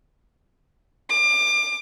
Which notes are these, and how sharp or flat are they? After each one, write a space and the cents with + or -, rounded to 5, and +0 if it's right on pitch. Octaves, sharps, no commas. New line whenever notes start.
D6 +30